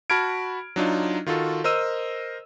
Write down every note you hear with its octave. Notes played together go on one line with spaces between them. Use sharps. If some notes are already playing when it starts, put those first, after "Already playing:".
F#4 A5 B5 F6 G#6 D7
F#3 D4 D#4 F4
D#3 F4 F#4 A4
A#4 C5 D#5 E6 D#7